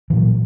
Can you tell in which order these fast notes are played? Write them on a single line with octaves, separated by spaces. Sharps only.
E3 A#2 F#3